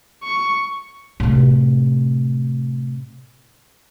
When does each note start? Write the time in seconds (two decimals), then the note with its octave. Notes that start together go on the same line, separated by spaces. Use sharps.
0.23 C#6
1.20 A2 C3